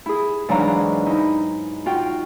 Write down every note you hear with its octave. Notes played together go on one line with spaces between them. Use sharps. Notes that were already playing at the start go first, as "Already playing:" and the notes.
E4 G#4
G#2 E3 F#3 D4 F5 A#5
D#4 E4
F4 F#4 G5